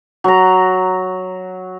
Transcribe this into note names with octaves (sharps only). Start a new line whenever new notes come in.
F#3 A#5